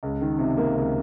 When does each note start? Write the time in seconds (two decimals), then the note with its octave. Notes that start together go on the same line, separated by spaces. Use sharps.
0.03 C#2
0.21 D#3
0.39 C3
0.57 A#3
0.75 C#2